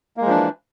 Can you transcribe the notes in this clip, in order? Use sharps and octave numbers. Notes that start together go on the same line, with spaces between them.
E3 F3 G#3 A#3 D4